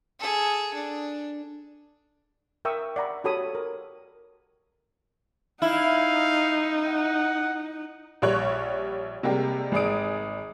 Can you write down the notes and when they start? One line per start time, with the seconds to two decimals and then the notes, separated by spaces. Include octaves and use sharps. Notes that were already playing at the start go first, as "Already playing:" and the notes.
0.20 G#4 A4
0.74 D4
2.65 A#4 E5 G5 C#6 D#6 E6
2.96 D5 F#5 A#5 B5
3.24 F#4 G4 A4 C#5 B5 D#6
3.55 A#4
5.62 D#4 E4 F5
6.88 F#5
8.22 A#1 G3 C#5 F#6
9.23 C3 G3 G#3 A#3 G4
9.72 G#1 G#4 D5 D#6 D7